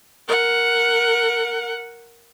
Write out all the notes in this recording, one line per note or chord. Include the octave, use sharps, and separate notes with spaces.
A#4 F#5